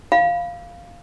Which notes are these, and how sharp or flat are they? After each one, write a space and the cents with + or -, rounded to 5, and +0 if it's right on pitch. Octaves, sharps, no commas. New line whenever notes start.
F5 +0 B5 -10